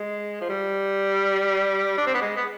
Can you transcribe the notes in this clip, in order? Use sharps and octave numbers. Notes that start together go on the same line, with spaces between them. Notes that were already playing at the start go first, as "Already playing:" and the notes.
Already playing: G#3
F3
G3
D4
C4
B3
G#3
B3